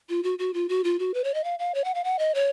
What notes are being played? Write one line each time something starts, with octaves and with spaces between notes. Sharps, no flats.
F4
F#4
F#4
F4
F#4
F4
F#4
B4
C#5
D#5
F5
F5
C#5
F#5
F5
F#5
D#5
C#5